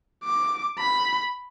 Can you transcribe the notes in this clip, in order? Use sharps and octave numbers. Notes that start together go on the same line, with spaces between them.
D6
B5